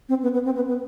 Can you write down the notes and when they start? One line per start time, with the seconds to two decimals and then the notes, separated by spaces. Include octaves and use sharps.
0.09 C4
0.23 B3
0.34 B3
0.45 C4
0.55 B3
0.67 B3